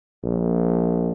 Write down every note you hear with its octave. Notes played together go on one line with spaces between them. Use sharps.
A#1